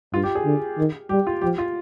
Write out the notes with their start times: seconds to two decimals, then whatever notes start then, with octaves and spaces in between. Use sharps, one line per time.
0.13 G2 F4
0.23 G4
0.35 G#4
0.45 D3
0.78 D#3
1.09 G3 G4
1.27 F4
1.42 F3 G4
1.58 F4